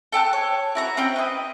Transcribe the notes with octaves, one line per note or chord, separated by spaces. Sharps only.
A4 G5 A5 F#6
C#5
E4 F#4 A#5
C4 C#4 E4 G5
B4 D#5